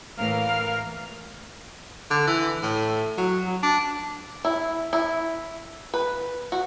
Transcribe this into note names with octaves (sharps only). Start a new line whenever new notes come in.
A2 E3 A#4 F5 F6
D3
E3
A2
F#3
F#3
D4
E4
E4
B4
F#4